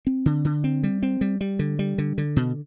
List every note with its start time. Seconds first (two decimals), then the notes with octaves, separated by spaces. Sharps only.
0.07 C4
0.26 D3
0.45 D3
0.64 C4
0.83 G3
1.03 C4
1.21 G3
1.41 G3
1.59 D3
1.79 G3
1.98 D3
2.18 D3
2.36 B2